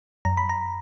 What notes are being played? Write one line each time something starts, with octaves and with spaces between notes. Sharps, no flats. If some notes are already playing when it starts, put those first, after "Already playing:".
F#2 A#5
B5
A#5